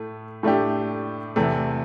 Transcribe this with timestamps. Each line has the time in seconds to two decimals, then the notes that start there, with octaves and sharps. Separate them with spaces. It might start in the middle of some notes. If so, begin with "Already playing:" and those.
Already playing: A2 A3
0.43 A2 A3 D4 G4
1.36 E2 C3 A3